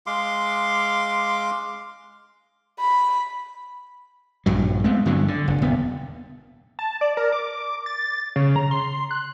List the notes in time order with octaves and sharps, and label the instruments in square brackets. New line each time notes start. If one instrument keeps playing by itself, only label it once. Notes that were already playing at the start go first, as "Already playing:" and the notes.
[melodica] G#3 F5 C6 D6
[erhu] B5
[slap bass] A#1 G2 F#3
G#3 A3 B3 C4
G2 D3 F#3
D3
F#1
D#1 B3
[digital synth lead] A5
D5
A#4
D6
A6
C#3
A#5
C6
F#6